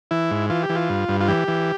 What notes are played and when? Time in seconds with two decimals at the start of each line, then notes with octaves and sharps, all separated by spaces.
0.11 E3 E4
0.31 G#2
0.50 E3 F4
0.63 G4
0.69 E3
0.76 F4
0.89 G2
1.09 G2
1.21 F4
1.28 E3 G4
1.48 E3